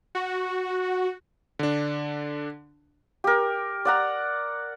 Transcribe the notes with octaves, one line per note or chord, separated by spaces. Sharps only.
F#4
D3 D4
G4 A#4
D5 F#5 A#5